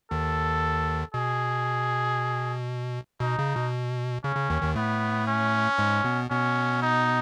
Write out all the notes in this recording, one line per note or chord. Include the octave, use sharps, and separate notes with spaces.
D#2 D#3 A4
B2 G#4
B2 D#4
C#3
B2
C#3 C#4
C#3
D#2 D#3
D#2 D#3
A2 A3 B3
C#4
G#2 G#3
B2 B3
B2 B3 C#4
D#4